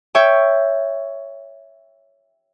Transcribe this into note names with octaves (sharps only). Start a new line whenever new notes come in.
C#5 E5 G5